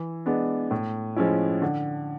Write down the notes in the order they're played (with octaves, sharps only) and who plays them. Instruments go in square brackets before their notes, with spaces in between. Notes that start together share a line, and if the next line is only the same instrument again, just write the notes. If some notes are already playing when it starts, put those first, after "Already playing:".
Already playing: [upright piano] E3
G#3 B3 D4
A2
F3 G#3 C#4 E4
D3